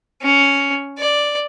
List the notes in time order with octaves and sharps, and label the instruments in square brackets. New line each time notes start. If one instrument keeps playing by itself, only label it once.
[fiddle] C#4
D5